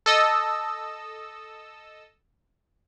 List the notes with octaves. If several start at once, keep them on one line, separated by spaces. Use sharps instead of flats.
A4 D#5 E6